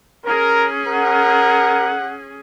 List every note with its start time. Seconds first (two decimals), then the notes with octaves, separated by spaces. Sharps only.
0.24 C#4 G#4 A#4
0.87 A#4 F#5